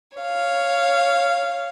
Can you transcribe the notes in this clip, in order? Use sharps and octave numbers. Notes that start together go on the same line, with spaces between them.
C#5 F5